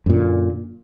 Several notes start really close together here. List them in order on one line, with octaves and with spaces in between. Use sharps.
F#2 A#2 D3